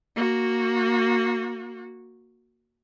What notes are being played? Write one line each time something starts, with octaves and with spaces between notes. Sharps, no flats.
A#3 F#4